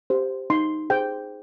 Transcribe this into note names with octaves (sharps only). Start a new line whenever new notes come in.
G4 C5
D#4 C6
G#4 C5 G5